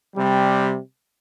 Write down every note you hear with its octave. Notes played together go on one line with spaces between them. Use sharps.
C3 G3